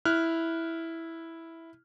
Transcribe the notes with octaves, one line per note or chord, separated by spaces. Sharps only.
E4 F6 F#6